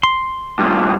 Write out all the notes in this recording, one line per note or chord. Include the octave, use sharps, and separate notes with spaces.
C6
G2 A#2